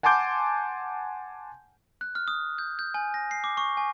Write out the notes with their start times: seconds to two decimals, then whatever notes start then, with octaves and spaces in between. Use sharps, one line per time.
0.03 F#5 G#5 A5 C6 D6 G6
2.01 F#6
2.15 F6
2.28 D#6
2.58 G6
2.79 G6
2.94 G#5
3.14 A#6
3.31 C7
3.44 D6
3.57 C#6
3.77 G#5